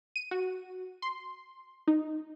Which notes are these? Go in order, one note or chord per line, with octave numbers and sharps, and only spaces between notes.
D#7
F#4
C6
D#4